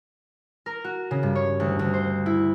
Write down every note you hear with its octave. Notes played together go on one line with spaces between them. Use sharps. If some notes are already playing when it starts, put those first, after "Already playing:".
A#4
F#4
C#3
G2
C#5
D2
D2
C5
E4